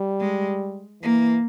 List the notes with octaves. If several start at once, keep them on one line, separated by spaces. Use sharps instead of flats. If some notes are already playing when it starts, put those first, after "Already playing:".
Already playing: G3
G#3
E3 A#3